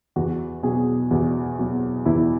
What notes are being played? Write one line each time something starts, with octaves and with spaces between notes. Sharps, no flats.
E2 F#4
B2 F#3 G#4
E2 F#4
B2 F#3
E2 E4